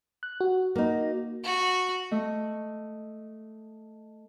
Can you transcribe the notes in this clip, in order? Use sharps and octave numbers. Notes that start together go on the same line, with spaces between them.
F#6
F#4
A#3 D#4
F#4
A3 D#5